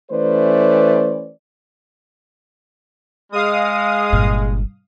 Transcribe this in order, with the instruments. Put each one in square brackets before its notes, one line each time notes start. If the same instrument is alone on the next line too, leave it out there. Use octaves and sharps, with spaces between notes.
[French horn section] E3 A3 C#4 B4 C5 D5
[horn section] G#3 [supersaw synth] F5 D#6
[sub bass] G1 [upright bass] G2 A#2